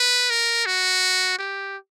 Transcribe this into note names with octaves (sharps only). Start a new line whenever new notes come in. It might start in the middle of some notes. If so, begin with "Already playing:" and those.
Already playing: B4
A#4
F#4
G4